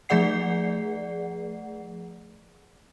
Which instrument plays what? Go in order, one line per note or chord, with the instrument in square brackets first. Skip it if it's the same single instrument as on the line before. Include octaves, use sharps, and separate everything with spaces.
[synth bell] F3 A3 G#4 D5 F#5 C7